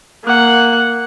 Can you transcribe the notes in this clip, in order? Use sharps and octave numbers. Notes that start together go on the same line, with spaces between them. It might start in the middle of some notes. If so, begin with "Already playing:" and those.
A#3 F#5